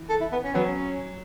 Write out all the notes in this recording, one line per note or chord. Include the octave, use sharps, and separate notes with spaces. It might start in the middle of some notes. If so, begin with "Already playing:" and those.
Already playing: E3
A4
E4
B3
C#4
F#3 B3
C#4